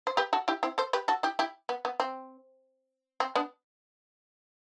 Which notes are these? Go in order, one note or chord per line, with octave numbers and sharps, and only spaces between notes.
C5
G4 B4
F#4 A4
E4 G4
C4 E4
A4 C5
G4 B4
F#4 A4
E4 G4
E4 G4
B3
B3
C4
C4
B3 D4